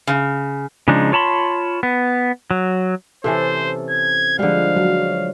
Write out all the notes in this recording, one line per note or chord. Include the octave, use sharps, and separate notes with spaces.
C#3
C#3 F3 G#3 D4 D#4
F4 C#5 A5 B5 C6
B3
F#3
C3 E3 C#4 A4 C5
G#6
D3 F3 G3 G#3 F5
F#3